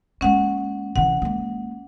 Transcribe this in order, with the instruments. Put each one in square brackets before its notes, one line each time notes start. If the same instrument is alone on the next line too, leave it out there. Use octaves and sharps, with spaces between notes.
[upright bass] G#3 A#3 [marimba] C#4 F#5
[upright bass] C3 E3 [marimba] F#5
[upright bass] G#3 A#3